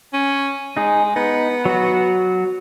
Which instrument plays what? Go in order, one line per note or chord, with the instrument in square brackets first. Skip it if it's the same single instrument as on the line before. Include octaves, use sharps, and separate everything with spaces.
[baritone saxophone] C#4
[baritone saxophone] G#3 [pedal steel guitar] D#4 G#4
[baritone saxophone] B3 [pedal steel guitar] D#4
[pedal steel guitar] F#3 F#4